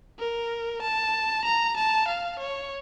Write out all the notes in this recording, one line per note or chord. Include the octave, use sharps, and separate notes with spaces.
A#4
A5
A#5
A5
F5
C#5